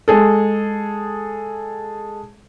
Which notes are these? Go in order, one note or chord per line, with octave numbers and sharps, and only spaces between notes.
G#3 G#4 A4